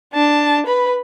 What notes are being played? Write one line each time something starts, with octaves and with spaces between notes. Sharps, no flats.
D4 A5
B4 B5